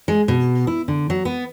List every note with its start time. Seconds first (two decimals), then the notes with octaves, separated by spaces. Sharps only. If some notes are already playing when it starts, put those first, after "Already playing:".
0.08 G#3
0.28 B2
0.67 E4
0.88 D3
1.10 F#3
1.25 B3